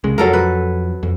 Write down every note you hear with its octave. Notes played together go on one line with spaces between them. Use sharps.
C2 C#3 G#3
F2 F#3 A4 A#4
B4
F2